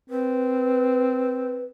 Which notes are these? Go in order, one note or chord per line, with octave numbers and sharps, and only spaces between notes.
C4 B4